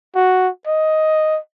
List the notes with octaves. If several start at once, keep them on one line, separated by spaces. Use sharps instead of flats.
F#4
D#5